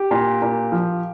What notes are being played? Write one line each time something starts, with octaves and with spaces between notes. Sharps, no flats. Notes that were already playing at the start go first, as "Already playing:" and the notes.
Already playing: G4
A#2
A#2
F3